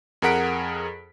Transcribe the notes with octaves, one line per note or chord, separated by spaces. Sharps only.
F2 G#4 A#4 F#5 B6 D7